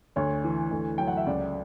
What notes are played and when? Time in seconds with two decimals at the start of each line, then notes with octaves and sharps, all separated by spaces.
0.16 D2 C#5
0.44 E3
0.71 D2
0.98 F#3 G5
1.07 F#5
1.17 E5
1.27 C#2 D5